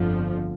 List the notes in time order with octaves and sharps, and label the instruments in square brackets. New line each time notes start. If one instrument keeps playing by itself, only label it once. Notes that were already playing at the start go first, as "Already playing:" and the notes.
Already playing: [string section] G1 F2 D3 F3